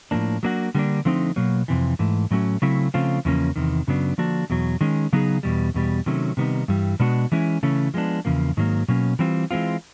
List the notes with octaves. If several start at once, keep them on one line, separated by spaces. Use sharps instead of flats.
A2 F3 A#3 D4
F#3 A#3 D4 F#4
D3 G3 A#3 D4
D3 F3 A3 C4 D#4
B2 F#3 A#3
F2 C3 E3
G#2 E3 A3
A2 F#3 A3 C#4 F#4
C#3 F#3 A3 C4 E4
C#3 F3 A3 C4 F4
E2 C#3 F3 A#3 C#4
E2 C3 D#3
F#2 C#3 F#3 B3 D4
D3 F3 A#3 D4 F#4
E2 B2 F#3
D#3 G#3 C#4
C#3 F#3 B3 D#4 G#4
E2 B2 G3
E2 B2 G3
C3 D#3 F#3 A3 C#4
C3 D#3 G3 B3 D#4
G2 E3 G3
B2 G#3 B3 D4 F#4
E3 G#3 C#4 E4
C#3 E3 A3 C#4
F3 G#3 B3 D4
E2 C#3 F3 A#3
G#2 D#3 F#3 A#3
B2 F#3 A#3 C#4
E3 G3 C4 F4
E3 G#3 C4 F4